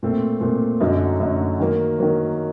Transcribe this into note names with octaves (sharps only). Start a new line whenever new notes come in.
A#2 A3 C4
A#2 A3 C4
F#2 D3 F#3 A3 D#4
F#2 D3 F#3 A3 D#4
D#3 F#3 A#3
D#3 F#3 A#3